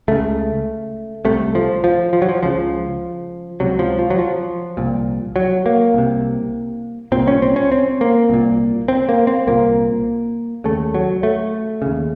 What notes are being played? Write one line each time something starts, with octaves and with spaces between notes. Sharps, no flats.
C#2 C#3 A3
C2 C3 A3
F3
F3
F3
F#3
F3
C#2 C#3 F3
C#2 C3 F#3
F3
F3
F#3
F3
C2 A#2
F#3
A#3
C2 C3
C2 A#2 C4
C#4
C4
C#4
C4
A#3
C2 A#2
C4
A#3
C4
C2 A#2 A#3
D#2 C#3 A3
F#3
A3
D#2 C#3